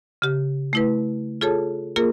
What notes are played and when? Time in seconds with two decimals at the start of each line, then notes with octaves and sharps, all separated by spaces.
0.22 C#3 G4
0.73 A3 E4 B4
1.41 F4 G#4 A4 C#5 A5
1.96 A#3 F4 G#4 A#4